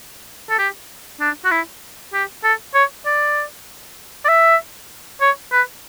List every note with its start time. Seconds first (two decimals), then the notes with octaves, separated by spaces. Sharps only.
0.50 A4
0.59 G4
1.21 D4
1.45 F#4
1.51 E4
2.14 G4
2.44 A4
2.74 C#5
3.06 D5
4.25 D5
4.28 E5
5.21 C#5
5.52 B4